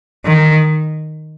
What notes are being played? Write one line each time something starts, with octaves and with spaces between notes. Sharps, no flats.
D#3